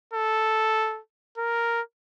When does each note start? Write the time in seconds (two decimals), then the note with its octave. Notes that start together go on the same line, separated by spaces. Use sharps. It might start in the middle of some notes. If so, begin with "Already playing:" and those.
0.13 A4
1.38 A#4